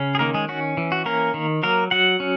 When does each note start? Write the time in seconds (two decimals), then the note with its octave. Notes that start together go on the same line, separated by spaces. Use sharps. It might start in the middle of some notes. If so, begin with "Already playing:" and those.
Already playing: C#3 C#4
0.15 G#4
0.19 D#3 A#3 A#4
0.34 G#3 G#4
0.49 C#4 F#4
0.77 E3
0.92 F#4
1.06 A#3 C#4 A#4
1.34 D#3
1.63 F#3 A#3 A#4
1.91 F#3 F#4 F#5
2.20 C#4